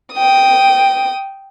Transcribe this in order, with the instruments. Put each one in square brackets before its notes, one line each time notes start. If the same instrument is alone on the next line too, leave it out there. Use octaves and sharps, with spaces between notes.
[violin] G5 D#6